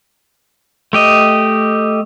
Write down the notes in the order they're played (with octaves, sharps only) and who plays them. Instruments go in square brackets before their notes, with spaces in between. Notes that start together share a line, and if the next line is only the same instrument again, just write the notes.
[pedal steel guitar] A3 G4 D#5